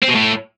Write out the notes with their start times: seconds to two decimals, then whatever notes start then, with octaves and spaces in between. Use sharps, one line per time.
0.02 C4
0.09 B2
0.15 A2